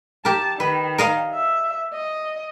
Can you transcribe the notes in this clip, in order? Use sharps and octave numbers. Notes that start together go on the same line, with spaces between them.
G4 A#4 A5
D#3 B4
A#4 D#5 F5
E5
D#5